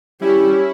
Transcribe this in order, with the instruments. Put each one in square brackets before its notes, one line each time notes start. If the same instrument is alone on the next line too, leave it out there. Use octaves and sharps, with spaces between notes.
[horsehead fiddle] G3 [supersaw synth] C#4 E4